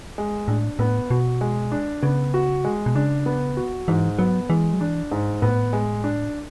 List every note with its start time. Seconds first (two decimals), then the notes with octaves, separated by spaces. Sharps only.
0.18 G#3
0.48 A2 D4
0.79 A2 B3
1.10 B2 F#4
1.41 G#3
1.72 D4
2.02 C#3 B3
2.34 F#4
2.65 G#3
2.86 B2
2.95 C#3 D4
3.26 B3
3.57 F#4
3.88 G#2 E3
4.18 F#3 B3
4.49 E3 G#3
4.74 F#3
4.81 E3 D4
5.11 G#2
5.42 A2 B3
5.73 G#3
6.04 D4